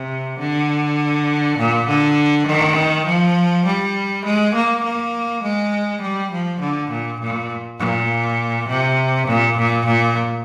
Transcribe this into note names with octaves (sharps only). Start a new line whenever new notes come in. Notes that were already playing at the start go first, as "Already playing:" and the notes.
Already playing: C3
D3
A#2
D3
D#3
F3
G3
G#3
A#3
A#3
G#3
G3
F3
D3
A#2
A#2
A#2
C3
A#2
A#2
A#2